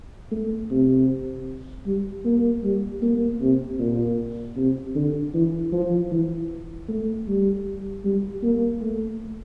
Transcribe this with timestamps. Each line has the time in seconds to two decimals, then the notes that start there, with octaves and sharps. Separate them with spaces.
0.31 A3
0.70 C3
1.86 G3
2.25 A#3
2.63 G3
3.02 A#3
3.40 C3
3.79 A#2
4.56 C3
4.95 D3
5.34 E3
5.72 F3
6.11 E3
6.88 A3
7.27 G3
8.04 G3
8.43 A#3
8.81 A3